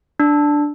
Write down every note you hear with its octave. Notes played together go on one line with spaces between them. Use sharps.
D4